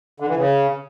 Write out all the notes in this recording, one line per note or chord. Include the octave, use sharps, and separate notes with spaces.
D3
E3
C#3